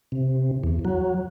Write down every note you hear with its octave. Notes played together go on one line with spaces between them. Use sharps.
C3
E2
F#3